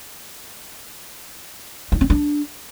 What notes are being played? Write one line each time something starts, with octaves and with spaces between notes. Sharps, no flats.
D#4
C4
D4